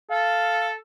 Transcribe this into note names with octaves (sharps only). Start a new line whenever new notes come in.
A4 F5